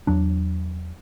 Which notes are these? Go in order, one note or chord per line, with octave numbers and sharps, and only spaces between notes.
E2 F#3 D4